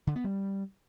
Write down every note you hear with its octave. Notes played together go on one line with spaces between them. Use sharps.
D3
B3
G3